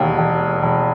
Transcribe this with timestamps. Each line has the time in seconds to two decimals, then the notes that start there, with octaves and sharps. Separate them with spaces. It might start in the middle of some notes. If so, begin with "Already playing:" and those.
Already playing: E1 D#2
0.18 E1
0.63 E1